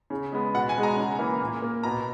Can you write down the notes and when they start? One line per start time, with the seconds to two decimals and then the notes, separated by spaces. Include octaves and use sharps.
0.10 C#3
0.32 G#3 B3
0.54 B2 F#5
0.69 G#5
0.76 G#3 B3
0.83 A#5
0.97 C#3
1.19 E3 A#3
1.40 A#2
1.62 A#3
1.83 B2 A#5